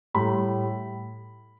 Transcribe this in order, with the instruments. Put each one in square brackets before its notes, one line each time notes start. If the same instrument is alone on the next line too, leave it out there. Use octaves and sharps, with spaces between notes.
[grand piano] A2 G3 B5